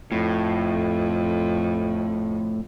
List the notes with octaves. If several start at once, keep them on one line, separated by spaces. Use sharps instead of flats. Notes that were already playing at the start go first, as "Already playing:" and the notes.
F2 A2